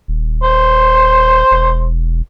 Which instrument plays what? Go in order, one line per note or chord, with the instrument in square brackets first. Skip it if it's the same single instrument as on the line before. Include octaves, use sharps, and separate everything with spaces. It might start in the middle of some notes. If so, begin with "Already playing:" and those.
[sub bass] D#1
[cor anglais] C5
[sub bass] E1